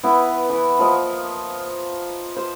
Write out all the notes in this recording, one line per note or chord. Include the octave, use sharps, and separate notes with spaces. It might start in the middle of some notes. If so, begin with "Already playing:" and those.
B3 E4 B4
E3
F3 A#3 D#5
C5